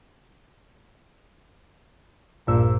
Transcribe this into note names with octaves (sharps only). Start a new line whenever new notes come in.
A#1 G2 A#2 E6